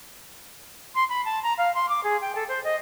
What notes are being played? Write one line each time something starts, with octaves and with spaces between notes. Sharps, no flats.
C6
B5
A5
A#5
F5
C6
D6
G#4
G5
A4
C5
D#5